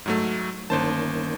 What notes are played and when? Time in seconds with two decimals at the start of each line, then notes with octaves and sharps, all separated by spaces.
0.06 G#2 F#3 A3
0.70 G1 D#3 A#3 C#4 C5 A5